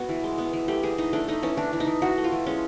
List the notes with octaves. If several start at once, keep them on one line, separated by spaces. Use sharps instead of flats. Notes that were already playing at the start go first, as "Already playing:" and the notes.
Already playing: B3 F#4
E3
G#3
B3
E3
A3 G4
E3 G#4
E3 D#4
A3 D4
A3 D#4
E3 C#4
E3 D4
E3
D#4
E3
E3 F#4
A3
F4
E3
G#3 C#4